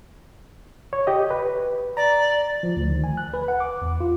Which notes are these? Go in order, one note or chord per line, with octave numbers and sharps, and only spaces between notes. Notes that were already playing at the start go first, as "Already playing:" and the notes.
C#5
G4 D#5
B4
D5 A#5
F3
D2
D#3
G#5
F#6
B4
F#5
D6
E2
F4